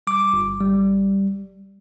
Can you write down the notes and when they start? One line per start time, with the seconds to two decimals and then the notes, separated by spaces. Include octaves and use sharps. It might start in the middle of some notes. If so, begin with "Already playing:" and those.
0.07 G3 D6
0.33 G1
0.60 G3